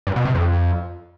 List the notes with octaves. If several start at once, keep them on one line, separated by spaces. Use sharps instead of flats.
G2
B2
C3
F2